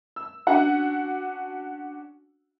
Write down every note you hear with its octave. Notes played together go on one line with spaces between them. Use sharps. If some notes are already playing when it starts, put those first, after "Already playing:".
E6
C#4 D4 F#4 F#5